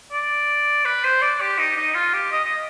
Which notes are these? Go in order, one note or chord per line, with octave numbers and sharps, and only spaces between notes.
D5
B4
C5
D5
G4
D#4
D#4
F4
G4
D#5
D#5